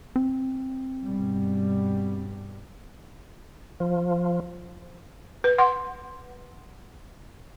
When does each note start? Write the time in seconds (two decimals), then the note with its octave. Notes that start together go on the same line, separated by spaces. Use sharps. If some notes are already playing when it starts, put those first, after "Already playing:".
0.16 C4
1.04 G2 B2 G3
3.80 F3
5.44 B4
5.58 F#5 C6